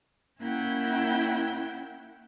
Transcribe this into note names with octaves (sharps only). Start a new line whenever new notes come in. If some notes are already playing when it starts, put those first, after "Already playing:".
A#3 C#4 E4 E5 F#5 G5